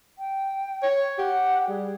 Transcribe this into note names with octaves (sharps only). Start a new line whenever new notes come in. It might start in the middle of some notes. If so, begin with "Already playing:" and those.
G5
C#5
G4 F#5
G3 G#4